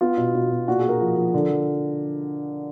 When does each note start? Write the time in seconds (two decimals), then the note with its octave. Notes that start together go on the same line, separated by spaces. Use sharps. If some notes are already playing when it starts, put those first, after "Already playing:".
0.01 B3 F4
0.17 B2
0.34 B2
0.51 B2
0.68 A#2 F#4
0.79 A#2 G#4
0.89 A#4
1.01 F3
1.17 F3
1.34 D3
1.49 F3